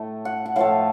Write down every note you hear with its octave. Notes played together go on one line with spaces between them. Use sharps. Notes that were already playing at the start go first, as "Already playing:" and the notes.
Already playing: A2 A3
F#5
F#5
A2 F3 A3 F5